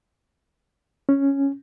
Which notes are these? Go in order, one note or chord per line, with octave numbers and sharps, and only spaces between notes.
C#4